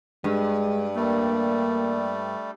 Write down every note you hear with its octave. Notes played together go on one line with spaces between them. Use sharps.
G2 G#3
G3 A3 A#3